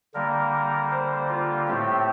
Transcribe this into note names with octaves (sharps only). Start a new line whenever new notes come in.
D3 G3 A#3 A#4
C5
F4
A2 A3 C4 G4